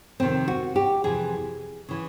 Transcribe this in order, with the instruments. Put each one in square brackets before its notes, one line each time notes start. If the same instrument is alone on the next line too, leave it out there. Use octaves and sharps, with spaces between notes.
[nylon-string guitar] F2 C3 D#3 C4
F#4
G4
F2 C3 E3 G#4
C#3 E3